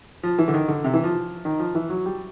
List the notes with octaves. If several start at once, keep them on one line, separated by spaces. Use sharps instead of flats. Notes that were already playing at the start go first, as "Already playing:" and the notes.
F3
E3
D3
D#3
D3
C3
E3
F3
D#3
F3
E3
F#3
G3